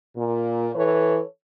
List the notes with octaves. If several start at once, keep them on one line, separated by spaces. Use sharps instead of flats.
A#2
E3 A4 B4 C#5